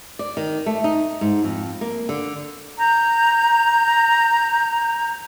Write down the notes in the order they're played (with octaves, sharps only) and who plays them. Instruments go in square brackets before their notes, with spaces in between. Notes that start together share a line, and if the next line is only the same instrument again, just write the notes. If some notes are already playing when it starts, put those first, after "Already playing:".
[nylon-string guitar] D5
D#3
A3
D#4
G#2
F2
A#3
D3
[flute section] A#5 G6